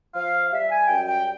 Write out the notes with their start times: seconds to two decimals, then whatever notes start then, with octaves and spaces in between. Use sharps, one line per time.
0.15 F3 F5
0.51 G3 E5
0.69 G#5
0.87 F#2 G5
1.06 G5